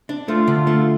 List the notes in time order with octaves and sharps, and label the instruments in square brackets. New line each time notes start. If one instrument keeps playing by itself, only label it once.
[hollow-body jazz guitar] D4
[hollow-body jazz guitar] A3 [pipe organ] F4
[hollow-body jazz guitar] D3
A3